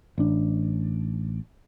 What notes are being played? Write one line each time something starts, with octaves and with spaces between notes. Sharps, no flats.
A1 D4